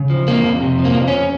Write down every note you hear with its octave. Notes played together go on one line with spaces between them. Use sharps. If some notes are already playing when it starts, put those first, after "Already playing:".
Already playing: C#3
F3
F2 A#3
F2
C3
F3
A#3
F2
C#4